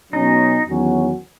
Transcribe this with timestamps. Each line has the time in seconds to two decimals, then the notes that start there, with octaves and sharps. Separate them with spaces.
0.13 B2 F#3 C#4 D#4
0.67 E2 D#3 F#3 C#4 F#4